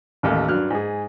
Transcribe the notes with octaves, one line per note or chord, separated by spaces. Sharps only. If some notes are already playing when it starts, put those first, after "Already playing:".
A1 D#2 A3
G2 F#3 F6 F#6
G#2 G#4